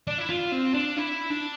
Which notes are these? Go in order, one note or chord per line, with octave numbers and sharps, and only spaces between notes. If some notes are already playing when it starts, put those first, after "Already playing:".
D4
E4
F4
C4
D4
E4
D4